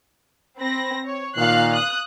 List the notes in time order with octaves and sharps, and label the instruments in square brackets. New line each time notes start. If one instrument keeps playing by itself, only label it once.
[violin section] C4 B5 A#6
C#5
[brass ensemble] A#2 D#3 [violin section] F5 F#6 C7
[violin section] D#6 F#6